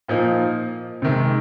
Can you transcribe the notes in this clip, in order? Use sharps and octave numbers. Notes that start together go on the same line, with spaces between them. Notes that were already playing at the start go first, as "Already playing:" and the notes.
A#2 F3 A#3 D#4
C3 D#3 G#3